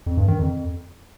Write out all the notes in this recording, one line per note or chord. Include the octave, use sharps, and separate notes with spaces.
F2
G2
D#3
F2